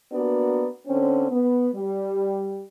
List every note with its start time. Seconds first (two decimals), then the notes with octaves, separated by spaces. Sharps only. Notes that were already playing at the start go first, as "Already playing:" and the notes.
0.12 A#3 B3 D4 F#4 D5
0.87 D3 C4 C#4
1.31 B3
1.75 G3